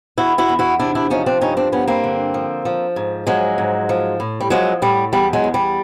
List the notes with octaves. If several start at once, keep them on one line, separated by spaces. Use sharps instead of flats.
E2 E4 F#4
E4 F#4
E2
E4 F#4
C3 D4 E4
D4 E4
F3 C#4 D#4
C4 D4
G2 C#4 D#4
C4 D4
G2 B3 C#4
A#3 C4
D3
F3
F3
G#2
F3 F#3 G#3
G#2
F3
A2
G3
F3 F#3 G#3
A2 G3
E2 G3
F#3 G#3
E2
G3